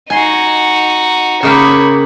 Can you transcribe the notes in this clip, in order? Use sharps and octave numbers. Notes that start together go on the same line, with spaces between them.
D#4 F#4 G#5 C6
C#3 A#3 G4 C#5 B5